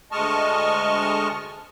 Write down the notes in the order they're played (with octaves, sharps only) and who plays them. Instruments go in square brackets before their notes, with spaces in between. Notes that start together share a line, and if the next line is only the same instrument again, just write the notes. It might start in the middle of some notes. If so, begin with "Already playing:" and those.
[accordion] D2 G#3 D#5 A5 C#6 F6